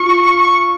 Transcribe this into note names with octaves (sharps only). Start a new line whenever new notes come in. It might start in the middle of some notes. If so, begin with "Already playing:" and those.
Already playing: F4 C#6
C#6